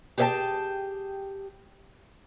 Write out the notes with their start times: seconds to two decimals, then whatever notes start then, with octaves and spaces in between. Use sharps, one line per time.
0.18 G4 G#4 C5 E5 G5 A5